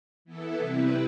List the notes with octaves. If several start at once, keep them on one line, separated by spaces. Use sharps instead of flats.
E3 B3 E4 A4
C3 G3 C4 E4 B4